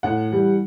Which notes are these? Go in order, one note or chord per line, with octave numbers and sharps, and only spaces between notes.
A2 F#5
E3 G3